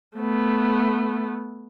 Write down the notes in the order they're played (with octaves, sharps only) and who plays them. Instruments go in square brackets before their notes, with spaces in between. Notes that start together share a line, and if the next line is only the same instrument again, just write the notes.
[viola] A3 B3